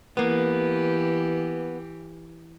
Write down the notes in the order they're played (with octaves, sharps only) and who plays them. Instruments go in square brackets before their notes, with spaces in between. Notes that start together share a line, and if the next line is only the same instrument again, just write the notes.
[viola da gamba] E3 G4 [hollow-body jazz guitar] A#3 B3